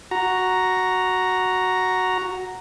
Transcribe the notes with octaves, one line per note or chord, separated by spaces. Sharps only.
F#4 A#5